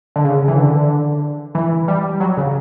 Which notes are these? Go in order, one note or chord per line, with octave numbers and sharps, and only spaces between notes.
D3
C#3
E3
D3
E3
G3
F#3
C#3